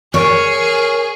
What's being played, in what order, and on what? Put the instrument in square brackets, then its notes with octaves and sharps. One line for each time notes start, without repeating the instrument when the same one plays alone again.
[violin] G#4 [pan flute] A#4 [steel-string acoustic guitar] C#5